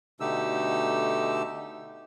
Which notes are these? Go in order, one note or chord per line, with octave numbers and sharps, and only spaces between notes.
B2 D3 A3 D#4 G4 E6